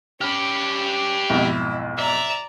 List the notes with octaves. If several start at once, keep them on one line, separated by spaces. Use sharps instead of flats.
C#4 G4 B4 F6
B1 F2 G#2 E4
D5 E5 A#5